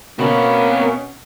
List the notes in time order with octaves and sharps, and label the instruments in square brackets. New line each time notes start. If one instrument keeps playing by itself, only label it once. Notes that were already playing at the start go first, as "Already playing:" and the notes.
[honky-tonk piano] B2 [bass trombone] A#3 [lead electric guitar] C4 B5 [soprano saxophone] C#4